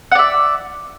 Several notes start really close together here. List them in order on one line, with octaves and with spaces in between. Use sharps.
F#5 D5 E5